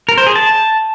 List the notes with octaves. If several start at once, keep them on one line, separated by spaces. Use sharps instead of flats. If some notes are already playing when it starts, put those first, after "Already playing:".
A#4
C5
G#4
A5